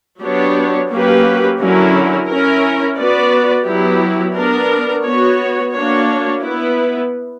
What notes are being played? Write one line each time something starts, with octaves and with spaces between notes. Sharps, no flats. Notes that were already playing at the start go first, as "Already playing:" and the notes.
F#3 B3 D4 G4 C#5
F#3 A#3 C#4 G4 B4
D3 F#3 C#4 E4 A#4
C#4 E4 A#4
B3 F#4 B4 D5
F#3 B3 E4 G4
B3 D4 A#4
B3 F#4 C#5
A#3 D4 F#4 C#5
B3 E4 B4